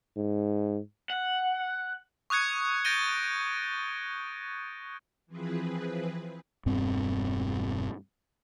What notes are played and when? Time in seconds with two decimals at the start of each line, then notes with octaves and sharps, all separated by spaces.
0.17 G#2
1.10 F#5
2.30 C#6 D#6 F#6 G#6 C#7
2.85 G6 A6 A#6 D7 D#7 G7
5.27 E3 F3 C4 G#4 B4
6.66 E1 G2 B2 C4